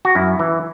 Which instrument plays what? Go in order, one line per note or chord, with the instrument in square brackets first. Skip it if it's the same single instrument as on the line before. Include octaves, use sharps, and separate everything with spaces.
[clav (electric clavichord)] F#4
F#2 E4
E3